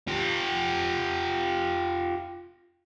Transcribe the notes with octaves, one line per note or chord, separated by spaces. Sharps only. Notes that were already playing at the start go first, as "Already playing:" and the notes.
F4 G4